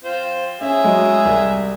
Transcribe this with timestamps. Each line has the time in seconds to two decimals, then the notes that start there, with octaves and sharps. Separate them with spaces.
0.04 C4 F4 C5
0.61 C#4 G#4 E5
0.84 F#3 G#3
1.25 C2